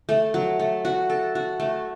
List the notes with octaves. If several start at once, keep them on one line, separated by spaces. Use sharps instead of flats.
A3
F#3
A3
F#4
A4
F#4
A3